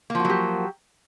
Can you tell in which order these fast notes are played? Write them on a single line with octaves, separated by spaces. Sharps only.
A#3 F3 F#4 F#3 G4